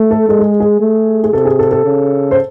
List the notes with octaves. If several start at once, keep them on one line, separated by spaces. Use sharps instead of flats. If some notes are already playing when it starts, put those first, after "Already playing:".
Already playing: A3
A4
G#3 A4
G#4
G#4
A3
G#4
C3 A4
G#4
A4
A4
C#3
C5